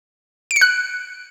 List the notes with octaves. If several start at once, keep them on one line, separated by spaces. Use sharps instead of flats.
D7
C#7
F#6